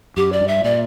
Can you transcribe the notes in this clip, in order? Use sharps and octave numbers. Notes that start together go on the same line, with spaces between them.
F#2 G4
D5
G2
E5
A#2 D5